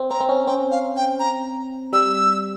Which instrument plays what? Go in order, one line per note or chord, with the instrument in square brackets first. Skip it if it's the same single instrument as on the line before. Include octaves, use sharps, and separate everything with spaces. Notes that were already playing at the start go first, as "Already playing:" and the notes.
Already playing: [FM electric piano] C4
[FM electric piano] C4 [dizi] A#5
[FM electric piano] C4
C#4
[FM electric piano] C4 [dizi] G5
[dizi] F5
G5
A#5
[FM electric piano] G3 [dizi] E6